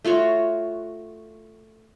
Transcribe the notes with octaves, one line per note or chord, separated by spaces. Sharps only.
A3 F4 F#4 C#5